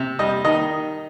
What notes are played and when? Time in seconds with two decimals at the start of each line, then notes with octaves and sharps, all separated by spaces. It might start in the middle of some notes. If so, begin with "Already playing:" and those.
Already playing: C3
0.19 G3 D#5
0.45 D#3 D#5